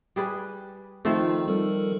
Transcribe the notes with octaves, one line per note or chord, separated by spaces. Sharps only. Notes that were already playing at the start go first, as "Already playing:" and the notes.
G3 G#4 B4
D#3 F3 A3 C4 D#4 F4
G3 A4 A#4